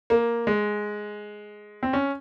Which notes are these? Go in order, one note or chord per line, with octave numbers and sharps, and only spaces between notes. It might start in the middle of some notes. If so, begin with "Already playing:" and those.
A#3
G#3
C4
C#4